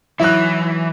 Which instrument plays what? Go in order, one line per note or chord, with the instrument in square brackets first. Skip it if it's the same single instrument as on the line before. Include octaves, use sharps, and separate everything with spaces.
[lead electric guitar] E3 [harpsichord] F#3 D#4 D#5 [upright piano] E4 F#6